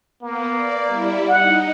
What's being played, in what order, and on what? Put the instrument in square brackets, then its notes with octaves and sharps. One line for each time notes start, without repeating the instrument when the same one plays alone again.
[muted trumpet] A#3 [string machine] B3
[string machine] D5
G3 E4
[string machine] D#4 [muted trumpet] F#5